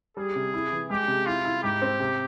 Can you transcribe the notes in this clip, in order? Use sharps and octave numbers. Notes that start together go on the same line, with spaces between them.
G3 G#4
C3
E4
E3
G#3 G4
C3
E4 F4
E4
G#2 G4
C4
C3